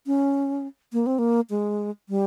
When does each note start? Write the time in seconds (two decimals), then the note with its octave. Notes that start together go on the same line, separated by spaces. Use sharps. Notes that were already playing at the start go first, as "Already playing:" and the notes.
0.07 C#4
0.93 A#3
1.06 C4
1.19 A#3
1.50 G#3
2.09 G3